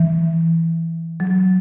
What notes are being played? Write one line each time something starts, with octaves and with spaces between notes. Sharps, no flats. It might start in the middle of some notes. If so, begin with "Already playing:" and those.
Already playing: E3
F#3